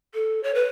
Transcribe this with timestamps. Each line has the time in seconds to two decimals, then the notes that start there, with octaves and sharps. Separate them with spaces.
0.14 A4
0.43 C#5
0.54 B4